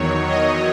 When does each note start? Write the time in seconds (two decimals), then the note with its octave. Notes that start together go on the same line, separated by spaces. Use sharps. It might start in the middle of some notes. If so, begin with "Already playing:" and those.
Already playing: E2 D#3 F#3 C#5
0.27 D#5